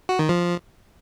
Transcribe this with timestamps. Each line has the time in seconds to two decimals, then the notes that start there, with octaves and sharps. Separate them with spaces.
0.09 F#4
0.19 D#3
0.29 F3